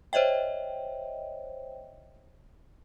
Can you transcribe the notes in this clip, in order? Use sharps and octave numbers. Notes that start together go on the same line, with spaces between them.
C5 C#5 D#5 E5 G5